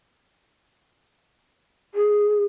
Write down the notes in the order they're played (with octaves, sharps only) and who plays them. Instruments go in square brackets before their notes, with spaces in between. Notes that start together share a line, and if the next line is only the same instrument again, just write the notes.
[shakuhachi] G#4